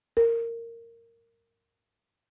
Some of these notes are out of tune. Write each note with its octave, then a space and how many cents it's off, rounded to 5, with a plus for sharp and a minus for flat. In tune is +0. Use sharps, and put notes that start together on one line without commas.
A#4 -15